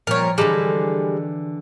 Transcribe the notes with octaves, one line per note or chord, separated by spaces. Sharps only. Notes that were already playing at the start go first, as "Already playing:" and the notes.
A#2 F3 G3 A#4 C#5
D3 E3 G3 G#3 A4